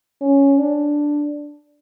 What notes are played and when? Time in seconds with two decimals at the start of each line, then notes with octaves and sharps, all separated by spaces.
0.22 C#4
0.59 D4